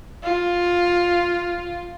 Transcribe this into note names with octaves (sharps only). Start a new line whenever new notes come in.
F4